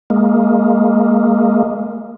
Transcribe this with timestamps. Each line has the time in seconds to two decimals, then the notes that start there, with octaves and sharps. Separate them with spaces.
0.10 G#3 A#3